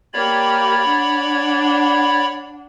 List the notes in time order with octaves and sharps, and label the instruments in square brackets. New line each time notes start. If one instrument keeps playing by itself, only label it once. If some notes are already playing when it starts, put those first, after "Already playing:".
[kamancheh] A#3 G4 [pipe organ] C#5 D5 B5
[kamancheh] D4 F#5